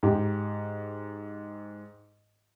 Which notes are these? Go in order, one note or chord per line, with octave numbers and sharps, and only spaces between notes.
G#2 G4